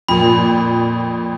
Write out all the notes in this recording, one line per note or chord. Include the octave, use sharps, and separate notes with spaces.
F2 A#2 B5